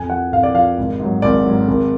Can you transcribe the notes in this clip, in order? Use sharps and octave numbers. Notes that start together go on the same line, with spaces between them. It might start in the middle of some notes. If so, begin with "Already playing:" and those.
Already playing: F2 G#5
F3 F#5
F2 F5
D5
F3 F5
G#1
G#2 F#3
G#1 D5
G#2 F#3
G#1